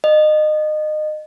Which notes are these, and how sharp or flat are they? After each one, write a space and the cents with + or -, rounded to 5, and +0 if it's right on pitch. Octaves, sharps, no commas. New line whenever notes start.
D#5 -25